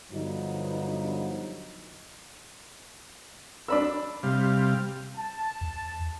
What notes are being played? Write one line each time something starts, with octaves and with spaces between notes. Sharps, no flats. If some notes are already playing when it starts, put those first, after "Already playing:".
G2 D3 F3 F#3 B3 D#4
D4 B5 E6
C3 G3 F5
A5
E2